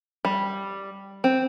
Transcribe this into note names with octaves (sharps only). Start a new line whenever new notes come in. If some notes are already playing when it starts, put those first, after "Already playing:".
G3
C4